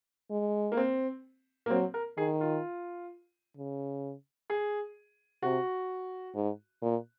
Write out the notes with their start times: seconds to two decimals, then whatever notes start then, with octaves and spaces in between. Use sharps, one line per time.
0.31 G#3
0.72 A#3
0.77 C4
1.66 A#3
1.70 F#3 C4
1.94 A#4
2.17 D#3 G#4
2.41 F4
3.57 C#3
4.50 G#4
5.42 C3 F#4
6.35 G#2
6.82 A#2